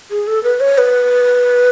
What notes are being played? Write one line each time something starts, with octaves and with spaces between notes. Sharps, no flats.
G#4
A4
B4
C#5
B4